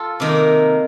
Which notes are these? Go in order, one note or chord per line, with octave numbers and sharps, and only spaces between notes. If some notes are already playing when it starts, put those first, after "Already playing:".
Already playing: F4 A4
C3 D#3 A#3